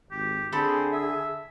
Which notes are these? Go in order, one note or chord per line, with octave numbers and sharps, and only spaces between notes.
G#1 G4
D3 C4 G#4 A4 B5
E5